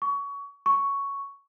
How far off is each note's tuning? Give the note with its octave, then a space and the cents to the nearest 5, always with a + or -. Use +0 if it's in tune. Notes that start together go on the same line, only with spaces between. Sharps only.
C#6 +25
C#6 +5